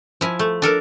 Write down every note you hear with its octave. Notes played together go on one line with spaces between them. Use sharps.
F3 E4 G#5
A3
D4 A4 A#4